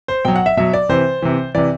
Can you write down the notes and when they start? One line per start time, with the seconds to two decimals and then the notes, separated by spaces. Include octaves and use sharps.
0.08 C5
0.25 B2 F#3 G5
0.36 F#5
0.46 E5
0.57 B2 F#3 E5
0.73 D5
0.89 C3 E3 C5
1.22 C3 E3
1.54 C3 E3 D5